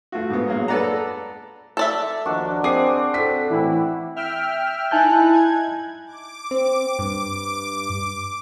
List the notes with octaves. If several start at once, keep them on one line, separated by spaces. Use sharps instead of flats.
A3 F4 F#4
G#2 B3
F#3 G#3 A#3
A4 B4 D5 F#5 A#5
A4 D5 E5
D#2 F3 D4 F#4 A#4 D#5
C4 G#4 D6 C7
A4 B6
A2 E3 C4 E4
E5 G5 F6
D#4 E4 G#5 A5 F#6 G6
G#6
D6
C4
G2